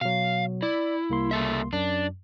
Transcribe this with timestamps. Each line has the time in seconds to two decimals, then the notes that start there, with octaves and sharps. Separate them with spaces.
0.01 B2 F#3 F5
0.63 E4 D5
1.10 C2 A#3 C6
1.31 C#3 A4 E5
1.73 F#2 D4